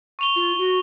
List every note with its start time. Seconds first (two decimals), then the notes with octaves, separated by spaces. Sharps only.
0.19 C#6 F7 G7
0.36 F4
0.58 F#4